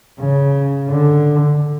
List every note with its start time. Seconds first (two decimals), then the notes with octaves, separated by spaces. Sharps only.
0.19 C#3
0.89 D3